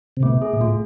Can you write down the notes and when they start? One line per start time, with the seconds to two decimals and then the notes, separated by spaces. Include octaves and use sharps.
0.17 C3
0.23 B2 A3
0.42 G#4
0.53 A#2
0.61 A2 F4